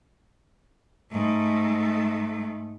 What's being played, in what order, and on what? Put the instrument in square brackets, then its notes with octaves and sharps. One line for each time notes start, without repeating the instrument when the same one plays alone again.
[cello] G#2 A3